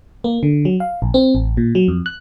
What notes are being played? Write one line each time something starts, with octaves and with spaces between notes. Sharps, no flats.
A#3
D3
F#3
F5
A#1
C4
A1
A#2
F#3
F2
F#6